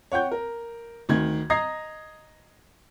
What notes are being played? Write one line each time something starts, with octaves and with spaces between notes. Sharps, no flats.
C#5 F#5 G5 G6
A#4
D2 D#3 G#6
D#5 A#5 D#6 G#6 A#6 C7